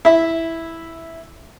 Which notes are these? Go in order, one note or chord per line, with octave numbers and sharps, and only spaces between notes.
E4 E5